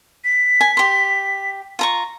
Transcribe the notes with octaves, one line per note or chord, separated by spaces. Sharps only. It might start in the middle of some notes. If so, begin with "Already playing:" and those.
B6
G#5
G4 C6
F4 A#5 C#6